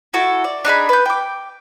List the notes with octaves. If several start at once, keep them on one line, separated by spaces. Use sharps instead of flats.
E4 F#4 A4
D5
D4 D#4 G#4 B5
B4 G6
G5 D6